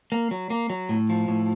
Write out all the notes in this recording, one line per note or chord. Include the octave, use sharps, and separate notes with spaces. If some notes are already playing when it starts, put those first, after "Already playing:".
A#3
F#3
A#3
F#3
A2
F3
A2